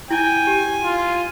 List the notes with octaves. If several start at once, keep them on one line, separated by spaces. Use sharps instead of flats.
E4 G5 G#5
G4
F4